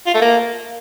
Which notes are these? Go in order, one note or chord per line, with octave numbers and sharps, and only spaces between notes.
F4
A3
A#3